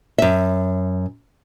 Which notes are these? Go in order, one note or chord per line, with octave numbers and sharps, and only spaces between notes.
F#2 E5